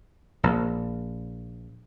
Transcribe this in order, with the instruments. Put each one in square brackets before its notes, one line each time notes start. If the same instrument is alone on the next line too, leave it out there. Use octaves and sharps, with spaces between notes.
[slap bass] A#1